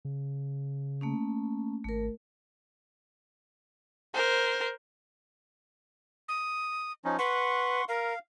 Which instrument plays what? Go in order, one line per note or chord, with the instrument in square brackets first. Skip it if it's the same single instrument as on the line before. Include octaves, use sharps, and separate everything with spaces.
[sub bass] C#3
[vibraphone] A3 A#3 C#4
[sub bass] G#1 [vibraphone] A3 A#4
[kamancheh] A#4 C5
[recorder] D#6
[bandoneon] F3 C#4 D#4
[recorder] B4 [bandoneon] F#5 C6 C#6
[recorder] A#4 [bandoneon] F5